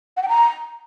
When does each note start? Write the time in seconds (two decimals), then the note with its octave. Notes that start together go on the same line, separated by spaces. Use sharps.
0.17 F#5
0.23 G5
0.29 A#5